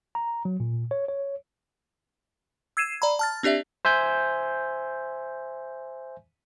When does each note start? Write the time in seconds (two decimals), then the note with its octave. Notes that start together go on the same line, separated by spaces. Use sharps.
0.15 A#5
0.45 F#3
0.60 A#2
0.91 C#5
1.08 C#5
2.77 E6 G#6 C7 D#7 E7
3.02 D5 A#5 B5
3.19 A5 F6 A6
3.43 C4 D4 G4 D5 E5
3.85 C5 E5 G#5 G6